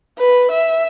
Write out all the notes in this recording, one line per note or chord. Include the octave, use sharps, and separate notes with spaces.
B4
E5